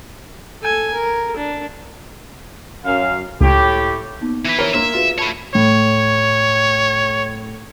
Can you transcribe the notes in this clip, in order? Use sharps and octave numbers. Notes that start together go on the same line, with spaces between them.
A4 G#5
A#4
D4
F#2 F5
C#2 A2 G4
A#3 B3 D#4
E3 B4
A#4 C#5
A#3 E5 C6
F4 F#4 G#4 B4
A3 C#5 A5 B5
A2 C#5